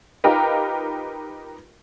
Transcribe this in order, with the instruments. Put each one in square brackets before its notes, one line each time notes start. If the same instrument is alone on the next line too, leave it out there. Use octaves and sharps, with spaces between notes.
[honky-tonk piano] D#4 F4 G4 A#4 B4